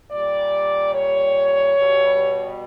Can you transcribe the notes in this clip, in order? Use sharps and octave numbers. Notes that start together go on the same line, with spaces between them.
A#2 G3 D5
C#5
B2 G3